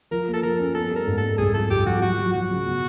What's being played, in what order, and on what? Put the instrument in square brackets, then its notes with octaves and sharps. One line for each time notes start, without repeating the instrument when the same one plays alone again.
[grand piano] F3 [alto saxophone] A#4
[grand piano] A#3
[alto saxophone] A4
[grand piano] F3 [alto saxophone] A#4
[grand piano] C#4
[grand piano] B3 [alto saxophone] A4
[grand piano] G3
[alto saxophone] A#4
[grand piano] G#2
[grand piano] G#2 [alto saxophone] A4
[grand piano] C2 [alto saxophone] G#4
[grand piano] F3 [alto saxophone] A4
[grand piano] C2 [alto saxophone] G4
[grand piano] F3 [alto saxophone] F#4
[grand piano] F#3 [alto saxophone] F#4
[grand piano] F#3
[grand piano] F#3 [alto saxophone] F#4
[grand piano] C#3
B2